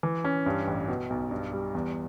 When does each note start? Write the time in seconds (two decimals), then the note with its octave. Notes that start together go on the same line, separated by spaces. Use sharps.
0.03 E3
0.24 C#4
0.46 G2
0.67 A1
0.88 B2
1.10 B1
1.31 G2
1.53 G3
1.75 E2